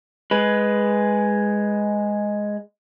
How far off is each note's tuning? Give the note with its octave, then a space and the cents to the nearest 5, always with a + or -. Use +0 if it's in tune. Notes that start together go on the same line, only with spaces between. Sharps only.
G#3 +0 B4 +0